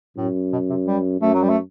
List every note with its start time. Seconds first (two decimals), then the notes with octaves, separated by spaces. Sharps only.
0.17 F#2 A2
0.53 B2
0.69 C3
0.87 G3
1.21 F#2 A3
1.34 F#3
1.42 G3
1.49 A3